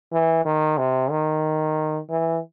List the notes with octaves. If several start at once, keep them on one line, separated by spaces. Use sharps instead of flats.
E3
D#3
C3
D#3
E3